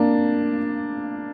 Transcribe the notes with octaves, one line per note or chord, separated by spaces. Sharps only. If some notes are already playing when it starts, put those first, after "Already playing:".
Already playing: A#3 D4